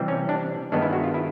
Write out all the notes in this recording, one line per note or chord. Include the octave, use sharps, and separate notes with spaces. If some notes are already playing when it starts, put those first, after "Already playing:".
Already playing: C3 E3 G3 C4
C#4
D4
G2 D#3 G#3 B3 D4
E4
F#4
F4
E4